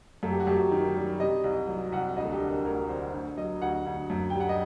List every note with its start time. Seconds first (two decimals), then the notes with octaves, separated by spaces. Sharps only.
0.23 F#2 A4
0.31 G4
0.40 F#4
0.47 F#2 G4
0.71 D#3
0.96 G3
1.20 C3 D#5
1.44 C2
1.68 F#3
1.92 C2 F#5
2.17 D2 D#5
2.25 A4
2.33 G4
2.40 D3
2.49 A#4
2.65 D2 A#4
2.89 D3 C5
3.13 D2
3.37 F#3 D#5
3.62 D2 F#5
3.86 D2
4.10 F#2
4.30 G3 G5
4.40 F#5
4.49 D#5